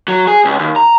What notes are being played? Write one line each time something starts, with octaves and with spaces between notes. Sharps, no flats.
F#3
G#4
C#2
D#2
A#5